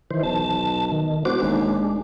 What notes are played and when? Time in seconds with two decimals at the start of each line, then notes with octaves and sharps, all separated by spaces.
0.11 D#3 E3 C5
0.23 D#1 B1 A5
0.92 D#3
1.25 E1 F#4 C5 D6
1.42 E1 D#2 G#3 D4